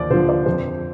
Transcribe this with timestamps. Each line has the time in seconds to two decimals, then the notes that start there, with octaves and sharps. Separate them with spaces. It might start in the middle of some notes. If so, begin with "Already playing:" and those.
Already playing: D#2 D3 F3 C5 D5
0.10 D3 F3 C5
0.29 D5
0.46 F2 C5